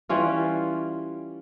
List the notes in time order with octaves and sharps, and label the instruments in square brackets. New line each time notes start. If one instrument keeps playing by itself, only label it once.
[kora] E3 G3 C#4 F4